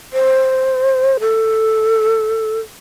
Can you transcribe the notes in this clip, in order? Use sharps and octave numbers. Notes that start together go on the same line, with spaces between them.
C5
A4